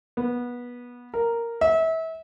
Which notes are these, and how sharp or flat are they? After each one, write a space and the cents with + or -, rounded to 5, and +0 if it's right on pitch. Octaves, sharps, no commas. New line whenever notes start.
B3 -20
A#4 -5
E5 -30